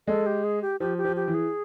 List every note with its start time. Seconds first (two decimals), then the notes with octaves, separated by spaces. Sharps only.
0.07 G#3 A4
0.26 G4
0.44 G#4
0.62 G4
0.80 F3 G4
0.98 G4
1.05 F3
1.16 G4
1.28 E3
1.34 G#4